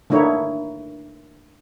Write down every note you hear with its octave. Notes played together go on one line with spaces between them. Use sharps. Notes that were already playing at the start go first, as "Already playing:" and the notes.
D3 A3 A#3 D#4 E4 C#5